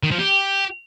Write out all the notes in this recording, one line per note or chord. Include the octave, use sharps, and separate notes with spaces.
D#3
F3
G4